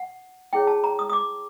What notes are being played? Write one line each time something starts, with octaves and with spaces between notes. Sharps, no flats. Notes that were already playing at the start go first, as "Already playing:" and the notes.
Already playing: F#5
E4 G#4 C#5 G5
A5
A#5
D#6
D#6
D6